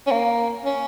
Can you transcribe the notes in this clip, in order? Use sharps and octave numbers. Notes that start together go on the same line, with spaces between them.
C#4
A#3
C#4